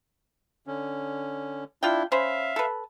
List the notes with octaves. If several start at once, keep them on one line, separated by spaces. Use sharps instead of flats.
D3 C#4
D4 E4 F4 G5
C#4 C5 E5 F5 B5
A4 B4